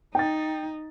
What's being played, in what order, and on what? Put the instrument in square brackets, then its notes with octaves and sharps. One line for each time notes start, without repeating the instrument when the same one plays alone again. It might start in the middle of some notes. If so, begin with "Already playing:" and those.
[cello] D#4 [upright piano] G5 A6